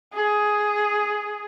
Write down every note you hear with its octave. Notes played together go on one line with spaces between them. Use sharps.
G#4